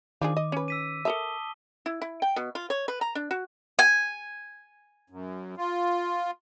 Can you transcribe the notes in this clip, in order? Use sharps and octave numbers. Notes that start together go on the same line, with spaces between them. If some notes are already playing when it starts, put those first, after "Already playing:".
D#3 F3 D4 G#4 D6
D#5
C#4 B4
E6 B6 D#7
A4 A#4 E5 A5 D#6 G7
E4
E4
G5
B2
F4
C#5
B4
A#5
D4
F#4
G#5
F#2
F4